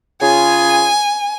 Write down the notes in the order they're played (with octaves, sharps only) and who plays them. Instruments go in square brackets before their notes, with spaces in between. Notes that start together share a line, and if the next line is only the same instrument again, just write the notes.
[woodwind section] C#3 F4 G#4 [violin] G#5